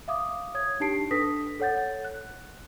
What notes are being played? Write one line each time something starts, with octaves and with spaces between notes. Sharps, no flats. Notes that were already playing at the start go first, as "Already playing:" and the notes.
E5 F5 D6 D#6
C#5 D#6 G#6
D4 D#4 G4 A5 C7 D7
D4 A4 B4 D#6 A#6 B6
A4 C#5 F#5 G6 A6
F#6